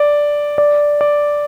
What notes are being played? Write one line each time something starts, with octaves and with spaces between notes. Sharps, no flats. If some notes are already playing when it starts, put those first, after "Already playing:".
Already playing: D5
D5
D5